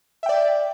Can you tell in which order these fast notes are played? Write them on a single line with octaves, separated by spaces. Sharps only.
E5 G5 D5